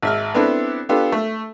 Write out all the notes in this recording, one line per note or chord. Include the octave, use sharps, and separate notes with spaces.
G#1 E5 F6
B3 C4 D4 E4 A4
B3 D4 F4 G4 A4
A3